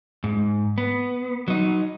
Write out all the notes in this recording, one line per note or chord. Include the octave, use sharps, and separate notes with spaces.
G#2
B3
F#3 D#4